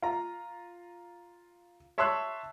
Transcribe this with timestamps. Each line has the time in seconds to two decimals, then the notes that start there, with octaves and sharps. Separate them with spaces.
0.02 F4 A#5
1.98 C#5 E5 A5 C6 E6 F#6